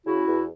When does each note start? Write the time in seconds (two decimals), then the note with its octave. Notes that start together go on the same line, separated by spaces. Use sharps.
0.06 C#3 E4 F#4
0.27 E2